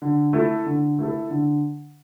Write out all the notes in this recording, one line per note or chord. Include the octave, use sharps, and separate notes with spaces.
D3
A3 E4 A4
D3
A3 E4 A4
D3